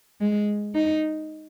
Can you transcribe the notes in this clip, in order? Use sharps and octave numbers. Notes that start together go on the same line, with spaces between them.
G#3
D#4